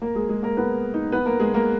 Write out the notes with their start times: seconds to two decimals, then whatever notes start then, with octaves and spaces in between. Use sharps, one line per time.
0.02 A#3 A#4
0.15 G#3 G#4
0.29 G#3 G#4
0.43 A#3 A#4
0.57 B3 B4
0.94 D#4
1.12 B3 B4
1.26 A#3 A#4
1.40 G#3 G#4
1.54 A#3 A#4